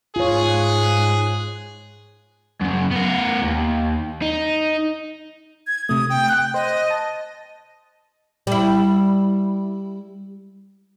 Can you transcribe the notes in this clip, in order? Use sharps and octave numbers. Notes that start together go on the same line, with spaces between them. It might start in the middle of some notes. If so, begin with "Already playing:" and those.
G#2 F4 G#4 C#5 F#6
F#2 C#3
B3 A#4
D#2
D#4
G#6
C3 A3 D#6
G5
G5 F#6 G6
C5 D#5
A5
G3 E4